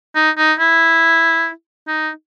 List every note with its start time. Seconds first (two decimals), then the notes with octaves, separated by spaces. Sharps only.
0.15 D#4
0.38 D#4
0.59 E4
1.88 D#4